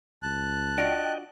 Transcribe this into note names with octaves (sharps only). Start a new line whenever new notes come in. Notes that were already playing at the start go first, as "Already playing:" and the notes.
C#2 A5 F#6
D4 F4 F#4 D#5 G5